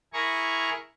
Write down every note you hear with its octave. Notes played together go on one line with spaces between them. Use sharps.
E4 G#4 A#4 G#5 A#5 C#6